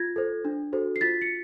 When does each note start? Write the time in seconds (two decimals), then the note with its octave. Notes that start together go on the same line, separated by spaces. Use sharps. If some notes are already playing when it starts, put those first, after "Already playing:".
Already playing: F4 G#6 A#6
0.16 A4 C5
0.45 D4
0.73 F#4 A4 C5
0.96 C7
1.01 F4 A6 B6
1.22 C#7